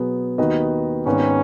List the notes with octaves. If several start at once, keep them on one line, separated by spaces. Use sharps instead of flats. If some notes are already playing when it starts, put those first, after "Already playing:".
Already playing: B2 F#3 B3 G#4
D#2 D#3 B3 F#4 D#5
G#1 G#2 D#3 B3 C#4